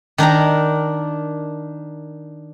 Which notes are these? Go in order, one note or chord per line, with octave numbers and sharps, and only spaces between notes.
D#3 D4 A#4 A#5